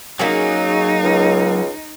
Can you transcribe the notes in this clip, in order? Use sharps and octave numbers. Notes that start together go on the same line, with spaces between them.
F#3 A#3 C#4 D#4 G#4
C#2